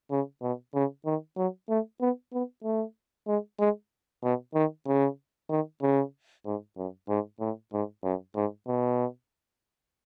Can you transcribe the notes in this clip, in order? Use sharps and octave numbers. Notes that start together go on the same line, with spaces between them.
C#3
B2
C#3
D#3
F#3
A3
B3
B3
A3
G#3
G#3
B2
D#3
C#3
D#3
C#3
G#2
F#2
G#2
A2
G#2
F#2
G#2
B2